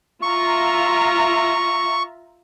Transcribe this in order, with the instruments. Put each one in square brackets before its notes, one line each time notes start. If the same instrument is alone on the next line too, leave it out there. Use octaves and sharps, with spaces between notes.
[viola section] F4 E5 A#5 [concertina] C#6